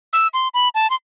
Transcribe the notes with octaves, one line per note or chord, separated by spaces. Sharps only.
E6
C6
B5
A5
C6